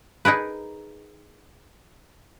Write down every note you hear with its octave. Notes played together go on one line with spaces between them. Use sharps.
D#4 G#4 A#4 B4